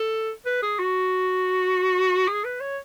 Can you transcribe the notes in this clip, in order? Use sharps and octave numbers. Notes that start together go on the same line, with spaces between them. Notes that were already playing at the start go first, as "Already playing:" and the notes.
Already playing: A4
B4
G#4
F#4
G#4
B4
C#5